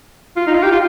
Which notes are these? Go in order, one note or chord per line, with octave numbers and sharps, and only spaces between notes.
F4
D#4
F4
G4
F4